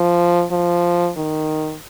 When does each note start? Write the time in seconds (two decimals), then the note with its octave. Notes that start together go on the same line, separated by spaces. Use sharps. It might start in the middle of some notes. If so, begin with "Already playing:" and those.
Already playing: F3
0.52 F3
1.17 D#3